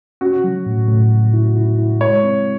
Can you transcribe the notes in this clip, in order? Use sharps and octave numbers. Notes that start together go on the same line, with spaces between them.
C#4 F#4
F#3
A2
A2
A2
E4
E4
E4
G#3 C#5
C4